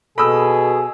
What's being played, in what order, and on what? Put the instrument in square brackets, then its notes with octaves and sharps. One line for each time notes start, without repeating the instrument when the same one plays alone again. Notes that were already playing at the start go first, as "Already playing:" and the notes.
[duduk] B2 [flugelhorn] G#4 [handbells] A4 [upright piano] B5 D#6 E6